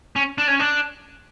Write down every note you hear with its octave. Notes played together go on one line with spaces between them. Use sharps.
C#4
D4
C#4
D4